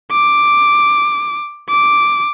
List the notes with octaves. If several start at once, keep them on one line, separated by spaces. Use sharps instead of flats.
D6
D6